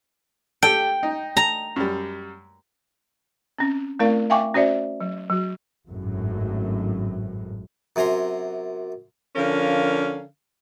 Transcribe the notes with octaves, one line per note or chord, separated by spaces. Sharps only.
G4 A4 G5
D#4
A#5
F#2 G3
C4 C#4
A3 C4 E4 A#4 D5 F5
E5 F5 G5 G#5 C#6 D6
C#4 F#4 C5 D5 E5
F#3
F#3 F#4
G#1 F#2 A2
F#2 C3 G#5 A#5 C6
D3 F3 C#4 A#4 F5